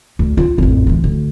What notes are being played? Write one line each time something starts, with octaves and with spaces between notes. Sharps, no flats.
D2
F4
A1 F2
D2 E3
D2